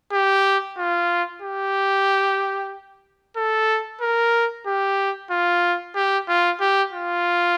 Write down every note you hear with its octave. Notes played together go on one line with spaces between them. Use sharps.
G4
F4
G4
A4
A#4
G4
F4
G4
F4
G4
F4